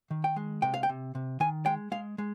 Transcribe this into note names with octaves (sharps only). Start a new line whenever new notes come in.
D#3
G5
G#3
C3 G5
F5
G5
C3
C3
D#3 G#5
G#3 G5
G#3 F5
G#3